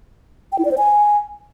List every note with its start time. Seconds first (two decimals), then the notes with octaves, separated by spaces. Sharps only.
0.52 G5
0.59 E4
0.65 D5
0.71 C5
0.78 G#5